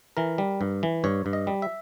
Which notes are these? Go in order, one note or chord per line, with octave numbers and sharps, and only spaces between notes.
E3 A#4
G3
G2
E3
G2 C#5
G2
D#5
G3
E5